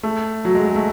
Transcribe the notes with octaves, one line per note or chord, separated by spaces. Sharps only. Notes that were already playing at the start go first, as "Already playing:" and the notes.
A3
F#3
G#3
G#3
A3